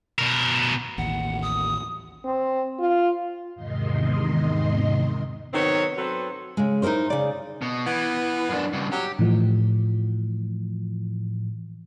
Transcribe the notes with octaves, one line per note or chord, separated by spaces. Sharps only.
B2 A#4
A1 D#2 F#5
D#6
C4
F4
E2 G#2 C3 D#3 D#5 C6
D#3 F#3 B3 C4 C#5
F#3 C4 A4 B4 C5
C#3 G#3
D#4 E4 G#4 A#4 C5
C#3 D5
B2
E3 B3
F#2 D4
G2 C#3
F#3 G4
A2 E3 F3